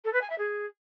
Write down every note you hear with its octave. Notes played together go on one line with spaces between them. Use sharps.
A4
B4
G#5
E5
G#4